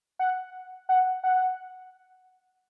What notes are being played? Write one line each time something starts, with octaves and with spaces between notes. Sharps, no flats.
F#5
F#5
F#5